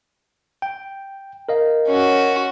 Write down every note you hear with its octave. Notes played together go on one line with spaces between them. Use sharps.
G5
A#4 D#5 F5
C#4 F#4